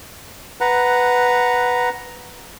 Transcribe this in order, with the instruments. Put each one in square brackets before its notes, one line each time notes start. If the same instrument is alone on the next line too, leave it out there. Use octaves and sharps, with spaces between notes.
[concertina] B4 F#5 A#5